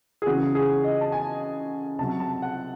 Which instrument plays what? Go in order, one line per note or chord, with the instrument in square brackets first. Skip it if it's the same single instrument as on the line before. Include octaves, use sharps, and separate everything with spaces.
[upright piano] G#4
C#3 E3 F#4
G#4
D#5
A5
G#5
C3 F#3 A5
A5
F#5